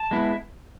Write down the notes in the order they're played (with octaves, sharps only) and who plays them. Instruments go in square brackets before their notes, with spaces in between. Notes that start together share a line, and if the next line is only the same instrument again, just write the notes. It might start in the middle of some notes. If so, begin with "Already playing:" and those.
Already playing: [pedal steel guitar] A5
G#3 B3 E4